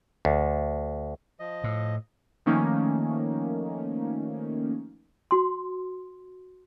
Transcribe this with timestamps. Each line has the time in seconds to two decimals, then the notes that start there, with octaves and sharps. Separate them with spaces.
0.25 D2
1.40 F3 D#5
1.64 A2
2.46 D#3 F3 A3 A#3 C#4 D#4
5.31 F#4 C6